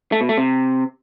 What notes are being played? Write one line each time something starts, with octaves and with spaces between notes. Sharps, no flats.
A3
B2
A3
C3